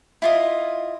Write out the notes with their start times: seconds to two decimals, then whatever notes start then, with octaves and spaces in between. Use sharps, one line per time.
0.22 E4 F4 D#5